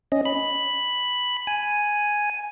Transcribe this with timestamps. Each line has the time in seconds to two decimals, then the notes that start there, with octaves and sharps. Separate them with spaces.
0.12 C#4 D#5
0.25 B5
1.47 G#5